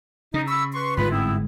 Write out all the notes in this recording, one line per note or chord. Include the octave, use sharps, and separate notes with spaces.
C#3 D#4
B5 C#6 E6
B4 C6 C#6
G1 G#2 G#3 F4 B4
B3 C4 E4